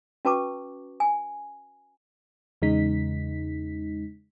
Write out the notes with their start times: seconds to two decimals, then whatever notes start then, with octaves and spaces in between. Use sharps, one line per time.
0.25 C#4 F#4 B4 A5 C#6 D6
1.00 G#5
2.62 E2 C#3 G#3 D#4 B6